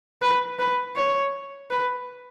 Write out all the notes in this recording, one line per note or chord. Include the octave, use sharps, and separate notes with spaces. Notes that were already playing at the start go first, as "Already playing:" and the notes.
B4
B4
C#5
B4